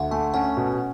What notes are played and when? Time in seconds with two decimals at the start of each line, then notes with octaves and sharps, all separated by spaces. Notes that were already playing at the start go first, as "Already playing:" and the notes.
Already playing: D2 E5 F#5
0.11 A3 G#5
0.34 C#4 F#5
0.57 B2